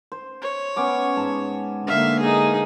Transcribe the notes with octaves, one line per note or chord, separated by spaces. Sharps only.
C5
C#5
B3 C#4 D6
G#2 A5
D3 A#3 E5 F5
D#4 G#4